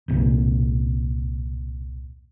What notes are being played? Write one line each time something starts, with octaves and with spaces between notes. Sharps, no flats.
E1 C2 A#2